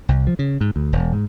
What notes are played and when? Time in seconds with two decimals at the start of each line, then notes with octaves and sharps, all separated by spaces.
0.09 C2
0.27 F3
0.39 C#3
0.61 G#2
0.76 D2
0.93 E1
1.13 G#2